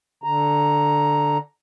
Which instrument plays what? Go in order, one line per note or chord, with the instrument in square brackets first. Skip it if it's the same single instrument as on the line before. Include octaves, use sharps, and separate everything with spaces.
[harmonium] D3 A#5